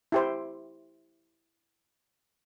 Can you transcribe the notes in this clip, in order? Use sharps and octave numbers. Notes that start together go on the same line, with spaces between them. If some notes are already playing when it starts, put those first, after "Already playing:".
E4 G4 C5